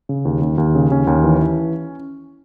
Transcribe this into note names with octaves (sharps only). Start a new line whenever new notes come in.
C#3
D#2
D#2
D#2
C#3
D#2 C#4
D#2
E3
E3